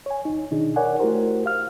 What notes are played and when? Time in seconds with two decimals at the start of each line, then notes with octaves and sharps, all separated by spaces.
0.06 C#5 G#5
0.25 D#2 D#4
0.51 B2 D#3 D4 D#4 G#4
0.76 A#4 C#5 D5 F#5 G#5
0.99 A3 E4 F#4 G4 A#4 C5
1.46 F5 F6